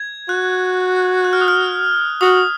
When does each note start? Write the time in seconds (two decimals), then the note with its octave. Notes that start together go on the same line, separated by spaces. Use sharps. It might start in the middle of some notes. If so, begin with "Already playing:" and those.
Already playing: G#6
0.29 F#4 F#6
1.24 F#6
1.33 F6
1.41 D#6
1.48 F6
2.21 F#4 D#6